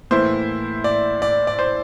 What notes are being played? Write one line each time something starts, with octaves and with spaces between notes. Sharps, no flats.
A2 E3 A#3 E4 C5
D5
D5
D5
C5